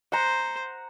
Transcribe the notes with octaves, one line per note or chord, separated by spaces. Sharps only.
C5 F#5 A#5